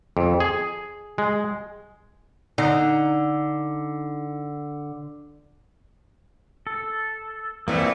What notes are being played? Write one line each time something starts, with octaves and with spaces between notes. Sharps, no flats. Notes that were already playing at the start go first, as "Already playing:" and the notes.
F2
G#4
G#3
D3 D#4
A4
A#2 E3 A3 A#3 C4 E4